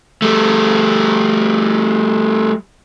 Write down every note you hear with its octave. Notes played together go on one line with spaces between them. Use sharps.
G3 A3